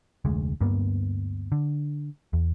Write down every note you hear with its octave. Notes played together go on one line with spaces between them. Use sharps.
F1 D2 G#3
D2 G2 A#3 B3
D3
E2